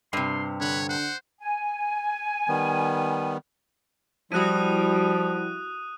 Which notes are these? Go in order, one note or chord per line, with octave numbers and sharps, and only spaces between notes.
G2 C3 C6
D3 B4 C#5
C5 F#5
G#5
D#3 G3 B3
F3 G3 E4 F#4 D#6 F#6 D#7